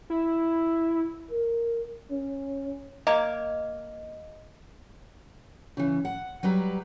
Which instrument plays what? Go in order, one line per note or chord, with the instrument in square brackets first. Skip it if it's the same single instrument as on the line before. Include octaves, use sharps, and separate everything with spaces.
[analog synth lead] E4
[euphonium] A#4
C#4
[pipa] A#3 [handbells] D#5
[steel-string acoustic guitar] C#3 E3
F#5
F#3 G3 B4 A#5